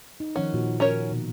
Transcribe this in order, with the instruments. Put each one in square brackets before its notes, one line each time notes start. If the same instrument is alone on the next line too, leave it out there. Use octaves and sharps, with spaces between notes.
[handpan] D#4
[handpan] D#3 F3 F#5 [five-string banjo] C#4
[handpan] A#2 F#4
[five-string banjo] C#4 A#4 C#5
[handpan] B2